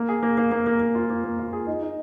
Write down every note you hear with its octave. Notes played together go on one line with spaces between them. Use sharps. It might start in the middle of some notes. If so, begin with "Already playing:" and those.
Already playing: A#3
G#4
A#3
A#3
A#3
A#3
A#3
F4
A#3
A#3
F4
G#4
D#4
D#4